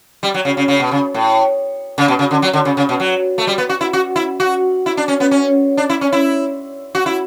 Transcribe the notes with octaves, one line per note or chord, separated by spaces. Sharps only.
G3
F#3
C#3
C#3
C#3
B2
C#3
A2
C#3
B2
C#3
D3
F#3
D3
C#3
C#3
B2
F#3
A3
G3
B3
F#4
E4
F#4
E4
F#4
E4
D4
C#4
B3
C#4
D4
E4
C#4
E4
F#4
E4